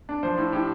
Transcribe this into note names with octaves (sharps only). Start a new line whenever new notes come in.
D4
F3 C5
A2
A2 G4